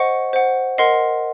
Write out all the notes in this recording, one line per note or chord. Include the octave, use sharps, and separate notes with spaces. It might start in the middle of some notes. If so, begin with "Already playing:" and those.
Already playing: C5 D#5 F#5 C#6 C#7
C5 F#5
A#4 D#5 F#5 C6 C7